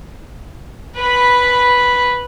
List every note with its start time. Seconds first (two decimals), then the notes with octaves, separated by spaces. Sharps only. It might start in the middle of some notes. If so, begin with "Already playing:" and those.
0.96 B4 B5